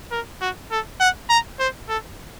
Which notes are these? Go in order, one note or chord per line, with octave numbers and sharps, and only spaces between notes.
A#4
F#4
A4
F#5
A#5
C5
A4